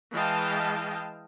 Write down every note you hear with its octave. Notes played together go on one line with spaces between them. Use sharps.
E3 G#3 D#5 F5 G5 A5